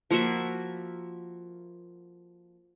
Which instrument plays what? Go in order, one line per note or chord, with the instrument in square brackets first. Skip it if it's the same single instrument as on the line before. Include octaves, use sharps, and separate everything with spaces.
[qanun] F3 A#3 F#4 E5